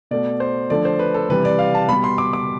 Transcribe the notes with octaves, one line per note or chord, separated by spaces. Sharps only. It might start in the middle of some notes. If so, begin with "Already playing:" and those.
B2 A3 D5
C5
D3 F3 A3 D5
C5
B4
A4
C3 E3 G3 B4
D5
F5
A5
B2 G3 B5
C6
D6
D6